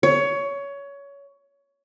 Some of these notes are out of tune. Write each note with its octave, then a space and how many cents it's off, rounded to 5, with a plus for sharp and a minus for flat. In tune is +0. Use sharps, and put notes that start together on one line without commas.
C#5 +20